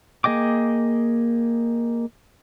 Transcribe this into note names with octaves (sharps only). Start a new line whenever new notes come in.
A#3 G#4 D#5 G5 D6